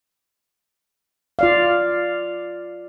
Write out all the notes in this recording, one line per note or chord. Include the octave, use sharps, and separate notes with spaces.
F4 D5 F5